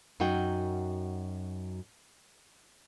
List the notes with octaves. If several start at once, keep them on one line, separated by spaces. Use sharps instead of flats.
F#2 D#4 F#4 G5